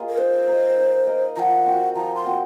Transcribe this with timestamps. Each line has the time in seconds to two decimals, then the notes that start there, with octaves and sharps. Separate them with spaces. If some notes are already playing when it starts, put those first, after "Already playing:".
Already playing: A#3 F4 G#4 D#5
0.09 A#4
0.18 D#4 C5
0.48 A#4 D#5
0.77 D#4
1.07 A#4 D#5
1.36 F3 F#5 A#5
1.66 C4 F#4
1.95 F3 A#5
2.15 C6
2.25 C4 F#4